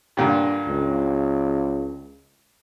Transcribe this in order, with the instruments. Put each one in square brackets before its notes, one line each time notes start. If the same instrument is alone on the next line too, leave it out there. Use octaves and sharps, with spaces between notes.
[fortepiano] G2 A#2 D3
[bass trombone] C#2